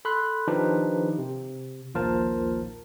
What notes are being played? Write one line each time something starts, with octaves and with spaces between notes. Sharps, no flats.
A4 B5 C6 F#6
D#3 F3 D4 D#4 G4 B4
C3
A#1 D#2 F4 A#4 C5 A5